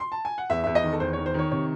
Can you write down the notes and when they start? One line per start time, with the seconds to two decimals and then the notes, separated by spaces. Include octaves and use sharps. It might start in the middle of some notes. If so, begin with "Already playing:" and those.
0.00 C6
0.12 A5
0.25 G#5
0.38 F#5
0.50 E2 E5
0.64 E2 E5
0.75 D#5
0.83 D#3
0.92 A4
1.00 E2 C5
1.13 C#5
1.18 D#3
1.26 C5
1.34 D#3 C#5
1.51 C3 C#5